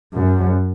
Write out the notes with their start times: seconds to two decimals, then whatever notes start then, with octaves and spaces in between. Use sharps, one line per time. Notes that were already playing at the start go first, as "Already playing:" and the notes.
0.14 F#2